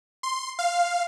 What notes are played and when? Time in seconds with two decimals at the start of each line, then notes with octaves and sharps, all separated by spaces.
0.23 C6
0.59 F5